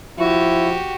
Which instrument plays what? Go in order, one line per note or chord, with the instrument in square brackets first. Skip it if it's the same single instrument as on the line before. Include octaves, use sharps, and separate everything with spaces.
[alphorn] F3 [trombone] E4 [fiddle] F#4 G4